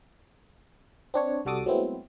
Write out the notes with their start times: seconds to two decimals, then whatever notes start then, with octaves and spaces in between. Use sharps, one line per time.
1.14 C4 D4 C#5
1.45 C2 G3 F#4 A4 D6 D#6
1.66 F#3 G#3 A3 B3 C4 E4